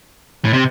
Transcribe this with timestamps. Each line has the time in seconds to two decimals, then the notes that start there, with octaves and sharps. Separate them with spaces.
0.45 A2
0.53 C3